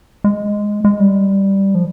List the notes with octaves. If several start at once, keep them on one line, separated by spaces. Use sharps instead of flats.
G#3
G#3
G3
F3